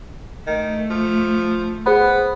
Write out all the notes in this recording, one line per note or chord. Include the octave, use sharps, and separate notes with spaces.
D#3 A3
F3
B3 G#4 C5 B5